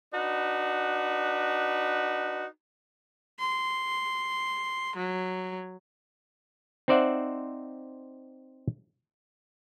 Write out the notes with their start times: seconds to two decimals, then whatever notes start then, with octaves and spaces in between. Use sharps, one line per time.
0.14 D4 D#4 F#4 B4
3.39 C6
4.96 F#3
6.88 C4 D#4 C5 D5 E5 F#5